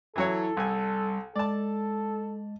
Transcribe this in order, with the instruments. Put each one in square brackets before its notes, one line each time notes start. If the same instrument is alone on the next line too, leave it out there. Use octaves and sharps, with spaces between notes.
[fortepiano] E3 F#3 C#5 [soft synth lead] E4 [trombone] A4
[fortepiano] C2 G#5 [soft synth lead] G3
[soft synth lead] G#3 [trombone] A4 [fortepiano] D5 A5